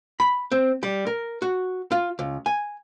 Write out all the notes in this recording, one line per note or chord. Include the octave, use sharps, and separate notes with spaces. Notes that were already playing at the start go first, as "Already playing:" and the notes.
B5
C4
G3
A#4
F#4
F4
C#2
G#5